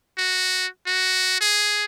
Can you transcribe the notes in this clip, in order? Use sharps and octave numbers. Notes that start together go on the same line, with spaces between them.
F#4
F#4
G#4